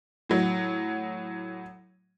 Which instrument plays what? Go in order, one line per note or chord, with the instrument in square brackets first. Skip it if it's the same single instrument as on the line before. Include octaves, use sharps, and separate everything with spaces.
[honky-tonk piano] A2 F#3